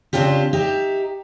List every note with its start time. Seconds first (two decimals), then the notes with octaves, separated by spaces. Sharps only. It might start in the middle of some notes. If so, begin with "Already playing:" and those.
0.13 C#3 C4 D4 F4 G4
0.53 D#4 G4 E5